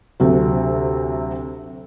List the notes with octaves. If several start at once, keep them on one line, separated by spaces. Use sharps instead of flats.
D2 C3 F#3